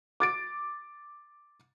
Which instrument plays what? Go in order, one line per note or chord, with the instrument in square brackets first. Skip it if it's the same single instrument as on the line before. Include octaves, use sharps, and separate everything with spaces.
[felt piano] D6 A6 D7